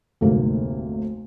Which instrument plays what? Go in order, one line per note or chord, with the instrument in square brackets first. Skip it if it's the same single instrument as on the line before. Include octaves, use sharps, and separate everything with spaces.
[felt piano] F1 D2 G#2 A#3